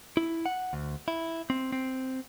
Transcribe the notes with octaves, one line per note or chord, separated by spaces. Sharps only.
E4
F#5
D2
E4
C4
C4